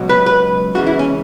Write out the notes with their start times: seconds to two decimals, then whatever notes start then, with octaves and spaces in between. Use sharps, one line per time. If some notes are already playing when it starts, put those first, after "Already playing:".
Already playing: C#2 B2 F#3
0.09 B4
0.26 B4
0.75 C#2 C#3 E3 F#4
0.87 E4
0.99 C#4